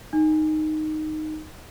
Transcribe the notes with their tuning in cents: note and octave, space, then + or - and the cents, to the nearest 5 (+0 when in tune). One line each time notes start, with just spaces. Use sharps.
D#4 -5